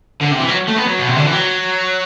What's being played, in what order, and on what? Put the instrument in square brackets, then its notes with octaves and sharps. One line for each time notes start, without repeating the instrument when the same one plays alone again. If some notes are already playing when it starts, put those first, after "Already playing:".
[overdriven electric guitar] D3
C3
E3
F#3
A3
B3
F#3
B2
C3
D3
E3
F#3